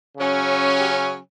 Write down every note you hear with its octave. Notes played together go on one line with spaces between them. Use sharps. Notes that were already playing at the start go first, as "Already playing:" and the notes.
C#3 F#3 C#4
G4